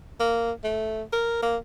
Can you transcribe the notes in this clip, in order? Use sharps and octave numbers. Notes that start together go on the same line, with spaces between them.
A#3
A3
A#4
A#3